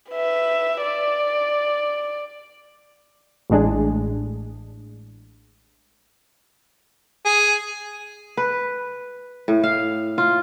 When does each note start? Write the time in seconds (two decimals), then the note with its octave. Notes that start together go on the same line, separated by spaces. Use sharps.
0.10 B4 E5
0.81 D5
3.50 A1 A2 G#3 D4 G#4
7.25 G#4
8.37 B4
9.48 A2
9.64 F5
10.18 F4